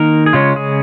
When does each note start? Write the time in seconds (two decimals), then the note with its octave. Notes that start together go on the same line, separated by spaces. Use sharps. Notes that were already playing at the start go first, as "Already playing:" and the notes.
Already playing: D#3 A#3 D#4 A#4
0.26 G#4
0.33 C#3 G#3 C#4 F4
0.56 G#4